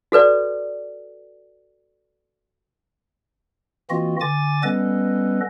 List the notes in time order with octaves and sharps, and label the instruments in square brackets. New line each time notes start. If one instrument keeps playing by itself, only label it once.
[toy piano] F#4 A4 B4 D5
[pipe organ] E3 A#3 C4 F4 F#4 D#5
D3 G#5 D6 A6
G3 B3 C#4 A4 B4 D#5